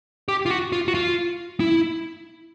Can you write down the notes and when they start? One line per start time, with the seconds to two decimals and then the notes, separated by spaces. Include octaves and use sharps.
0.28 G4
0.46 F4
0.51 F#4
0.72 F4
0.88 F#4
0.94 F4
1.60 E4